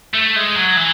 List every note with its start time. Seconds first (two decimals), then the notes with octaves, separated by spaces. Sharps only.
0.14 A3
0.36 G#3
0.55 F#3
0.76 E3